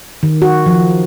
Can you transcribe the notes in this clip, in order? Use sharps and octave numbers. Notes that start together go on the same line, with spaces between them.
D#3
F#4
F3